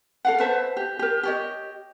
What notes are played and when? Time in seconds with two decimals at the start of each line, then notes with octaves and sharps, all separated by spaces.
0.25 A4 F5 F#5
0.40 B4 C5 E5 A5
0.77 G4
0.99 G4 A#4
1.23 G4 C#5 D#5